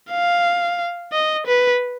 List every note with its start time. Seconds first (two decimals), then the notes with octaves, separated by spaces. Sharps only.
0.11 F5
1.13 D#5
1.47 B4